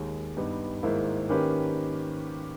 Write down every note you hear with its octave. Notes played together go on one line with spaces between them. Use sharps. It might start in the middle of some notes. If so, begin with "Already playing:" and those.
Already playing: D#2 D#3 G#3
G2 G3 B3 D#4
G#1 G#2 D#3 A#3 E4
D#3 A#3 C#4 G4 B4